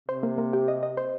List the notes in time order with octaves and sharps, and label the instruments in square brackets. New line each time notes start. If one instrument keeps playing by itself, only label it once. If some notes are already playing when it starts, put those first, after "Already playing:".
[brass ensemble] C3 [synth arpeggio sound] C5
[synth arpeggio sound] A#3
A#3
G4
D#5
D#5
C5